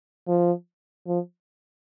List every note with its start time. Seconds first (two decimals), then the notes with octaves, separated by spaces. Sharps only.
0.28 F3
1.07 F3